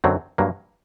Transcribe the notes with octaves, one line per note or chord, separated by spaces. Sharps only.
F#2 D3 F#3 C4
G2 F#3 A#3